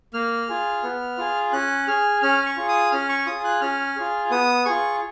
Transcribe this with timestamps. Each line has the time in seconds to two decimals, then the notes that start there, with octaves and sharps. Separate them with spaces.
0.14 A#3 F6
0.49 F4 G#4
0.83 B3
1.18 F4 G#4
1.53 C#4 F#6
1.87 G#4 F6
2.23 C#4 F6
2.46 C#6
2.57 F4 G#4
2.68 D#6
2.92 C#4 F6
3.09 C#6
3.27 F4 G#4 D#6
3.44 F#6
3.61 C#4 F6
3.96 F4 G#4
4.31 B3 D#6
4.65 F4 G#4 C#6